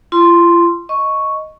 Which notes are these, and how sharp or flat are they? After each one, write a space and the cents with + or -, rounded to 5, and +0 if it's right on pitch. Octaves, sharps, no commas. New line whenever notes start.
F4 -40 C6 +0
D#5 +0 C#6 +0